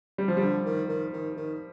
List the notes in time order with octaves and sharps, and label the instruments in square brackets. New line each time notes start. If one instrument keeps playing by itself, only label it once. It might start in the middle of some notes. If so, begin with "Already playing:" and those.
[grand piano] G3
F3
[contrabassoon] D3 [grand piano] G3
[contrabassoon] D#3
D#3
D#3
D#3